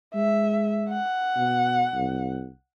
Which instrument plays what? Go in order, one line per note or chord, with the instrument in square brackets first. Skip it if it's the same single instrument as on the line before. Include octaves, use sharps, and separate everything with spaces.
[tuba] G#3 [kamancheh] E5
[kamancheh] F#5
[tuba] B2
C2